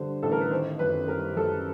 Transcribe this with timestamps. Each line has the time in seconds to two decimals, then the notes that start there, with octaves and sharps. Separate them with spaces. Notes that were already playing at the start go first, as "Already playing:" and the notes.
Already playing: G2 D3 G3 C5
0.22 A1 A4
0.32 A#4
0.41 B4
0.51 D#3 C5
0.79 F#2 B4
1.08 G3 A#4
1.36 F#2 A4